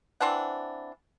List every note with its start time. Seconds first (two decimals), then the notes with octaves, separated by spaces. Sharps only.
0.20 E3 C4 D4 F#5